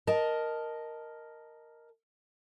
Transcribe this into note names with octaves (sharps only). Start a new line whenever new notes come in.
A#4 D#5 A5